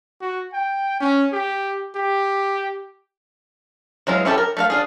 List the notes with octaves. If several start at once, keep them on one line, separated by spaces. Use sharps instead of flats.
F#4
G5
C#4
G4
G4
E3 F#3 G#3 F4
C#4 E4 F4 G4 A4
A#4
A3 A#4 F5
D4 F4 G#4